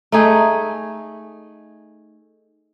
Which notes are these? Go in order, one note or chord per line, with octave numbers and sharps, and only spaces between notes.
A3 D#4 G#4